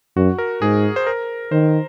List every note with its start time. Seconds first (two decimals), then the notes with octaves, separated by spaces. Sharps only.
0.16 F#2 F#4
0.38 A#4
0.61 G#2 G#4
0.96 C5
1.07 A#4
1.51 D#3 C5